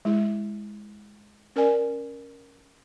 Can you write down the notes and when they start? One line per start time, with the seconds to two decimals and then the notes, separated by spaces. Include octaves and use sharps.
0.05 G#3 E4
1.56 C#4 A#4 D5 G#5